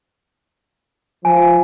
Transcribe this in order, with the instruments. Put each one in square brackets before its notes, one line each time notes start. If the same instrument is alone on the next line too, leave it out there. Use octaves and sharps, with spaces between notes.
[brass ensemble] F3 [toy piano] G#5